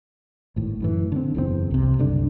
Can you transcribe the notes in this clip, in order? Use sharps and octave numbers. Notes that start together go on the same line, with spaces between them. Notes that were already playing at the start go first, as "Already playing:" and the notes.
G#1 A2
F#2 A2 E3
D3 C4
F#1 E2 G2 C4
C2 C3
F#1 C2 D3 D4